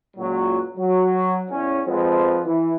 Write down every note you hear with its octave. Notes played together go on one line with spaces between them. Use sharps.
C#2 A#2 F#3
F#3
E2 C#4
F2 F3 G#3 B3 C4
E3